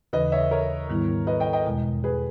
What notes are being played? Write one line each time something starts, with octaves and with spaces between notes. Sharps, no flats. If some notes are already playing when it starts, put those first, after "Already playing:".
D#2 C#3 E3 B4 D#5
C#5 E5
A#4 C#5
G#2 D#3 G3 B3 E4
B4 D#5
D#5 G5
D#5 G5
E2 B2 G#3
G#4 B4